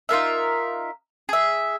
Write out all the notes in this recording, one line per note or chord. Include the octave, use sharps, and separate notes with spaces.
D#4 F4 A#4 E5
G#4 E5